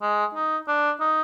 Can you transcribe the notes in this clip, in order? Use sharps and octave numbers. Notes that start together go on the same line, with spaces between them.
G#3
D#4
D4
D#4